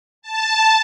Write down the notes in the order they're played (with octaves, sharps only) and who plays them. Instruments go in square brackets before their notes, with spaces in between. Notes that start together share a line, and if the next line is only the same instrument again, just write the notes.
[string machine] A5